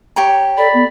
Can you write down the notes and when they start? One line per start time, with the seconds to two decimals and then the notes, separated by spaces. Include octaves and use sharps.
0.16 G4 C#5 A#5
0.57 A4 D5 B5
0.74 B3